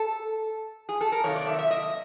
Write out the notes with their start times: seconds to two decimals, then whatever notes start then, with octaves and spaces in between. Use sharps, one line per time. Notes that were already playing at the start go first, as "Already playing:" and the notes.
Already playing: A4
0.89 G#4
1.01 A4
1.12 A#4
1.24 C3 D#3 F#3 A#3 C#5
1.36 D5
1.47 E5
1.59 E5
1.71 D#5